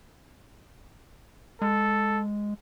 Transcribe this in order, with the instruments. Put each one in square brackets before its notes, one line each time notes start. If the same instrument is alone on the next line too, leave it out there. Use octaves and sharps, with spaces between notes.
[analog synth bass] G#3 [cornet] A4